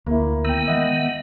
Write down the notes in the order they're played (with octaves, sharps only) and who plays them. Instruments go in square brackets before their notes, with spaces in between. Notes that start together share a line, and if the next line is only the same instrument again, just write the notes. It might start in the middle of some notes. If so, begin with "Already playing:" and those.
[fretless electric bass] D2 [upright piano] A#3 E4
[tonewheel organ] D#3 B3 [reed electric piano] G5 E6
[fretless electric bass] E3 G#3 [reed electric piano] D#5 E5 F#5